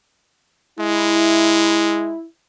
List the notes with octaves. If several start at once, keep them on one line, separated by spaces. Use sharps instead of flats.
G#3 E4